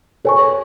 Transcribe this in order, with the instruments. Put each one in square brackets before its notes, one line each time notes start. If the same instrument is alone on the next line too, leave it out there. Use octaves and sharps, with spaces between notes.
[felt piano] A4 [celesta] C#5 G#5 C#6